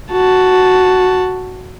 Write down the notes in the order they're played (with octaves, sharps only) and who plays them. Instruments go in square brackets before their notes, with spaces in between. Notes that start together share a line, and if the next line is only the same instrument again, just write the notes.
[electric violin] F#4 A5